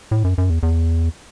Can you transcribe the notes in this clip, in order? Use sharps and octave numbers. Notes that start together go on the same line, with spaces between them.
A2
F#2
F#2
E2
E2